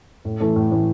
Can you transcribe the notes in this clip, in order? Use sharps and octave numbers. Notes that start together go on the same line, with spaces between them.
A2
E3 A3
A2
E3 A3